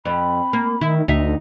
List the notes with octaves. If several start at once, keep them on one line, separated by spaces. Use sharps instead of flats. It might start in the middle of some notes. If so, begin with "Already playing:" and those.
F2 B5
A#3
D#3 E4
D2 D#4 E5